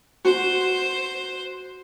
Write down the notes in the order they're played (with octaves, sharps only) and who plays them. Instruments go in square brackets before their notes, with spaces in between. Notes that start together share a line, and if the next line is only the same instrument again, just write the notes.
[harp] F#4 [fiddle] C5